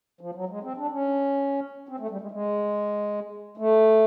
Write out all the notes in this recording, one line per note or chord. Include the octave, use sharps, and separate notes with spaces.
F3
F#3
G#3
C4
D4
C#4
C4
A3
G3
G#3
G#3
A3